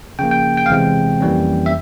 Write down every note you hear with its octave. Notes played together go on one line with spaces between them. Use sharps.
C#3 F3 A#3 G5
G5
G5
F5
E2 C3 E3 G#3 C4 G5
F2 E3 G3 A#3 C#4
E5